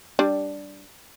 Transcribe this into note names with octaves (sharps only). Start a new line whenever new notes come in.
G3 D4 D5